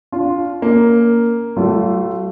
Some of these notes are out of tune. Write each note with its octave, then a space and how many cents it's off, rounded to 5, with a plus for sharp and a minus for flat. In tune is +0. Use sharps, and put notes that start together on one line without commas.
D4 -25 F4 +0
A#3 +0 C#4 +30
F#3 +40 A3 +0 F4 -10